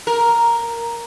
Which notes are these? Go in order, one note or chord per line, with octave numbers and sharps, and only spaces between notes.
A#4